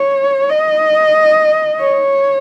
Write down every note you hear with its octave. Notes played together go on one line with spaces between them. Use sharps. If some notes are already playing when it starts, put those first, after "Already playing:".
Already playing: C#5
D#5
C#5